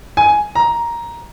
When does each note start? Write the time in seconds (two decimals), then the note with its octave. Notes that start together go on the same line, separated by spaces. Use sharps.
0.17 G#5
0.55 A#5